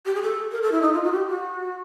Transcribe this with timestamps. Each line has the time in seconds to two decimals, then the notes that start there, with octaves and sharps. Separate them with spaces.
0.05 G4
0.14 G#4
0.22 A4
0.52 A#4
0.62 A4
0.72 E4
0.82 D#4
0.93 F4
1.03 F#4
1.12 G4
1.27 F#4